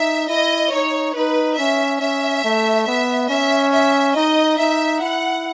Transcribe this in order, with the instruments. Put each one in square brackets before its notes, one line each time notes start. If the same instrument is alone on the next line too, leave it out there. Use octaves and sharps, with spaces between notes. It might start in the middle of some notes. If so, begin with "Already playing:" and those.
Already playing: [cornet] D#4 [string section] E5
[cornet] E4 [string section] D#5
[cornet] D#4 [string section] C#5
[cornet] D#4 [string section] B4
[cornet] C#4 [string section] E5
[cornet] C#4 [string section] E5
[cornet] A3
[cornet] B3 [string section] E5
[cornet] C#4 [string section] E5
[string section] E5
[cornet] D#4 [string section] D#5
[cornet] D#4 [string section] E5
[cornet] E4 [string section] F#5